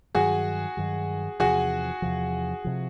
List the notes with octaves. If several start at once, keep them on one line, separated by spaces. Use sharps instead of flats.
G2 D#3 F#3 F#4 G#4
G2 D#3 F#3
E2 C3 F3 F#4 G#4
E2 C3 F3
C3 F3